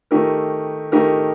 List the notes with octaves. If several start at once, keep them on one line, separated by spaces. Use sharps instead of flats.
D#3 A3 D#4 G4 A#4
D#3 A3 D#4 G4 A#4